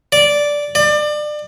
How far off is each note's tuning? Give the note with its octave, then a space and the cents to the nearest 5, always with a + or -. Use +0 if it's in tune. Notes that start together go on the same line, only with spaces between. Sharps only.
D5 -5
D5 +30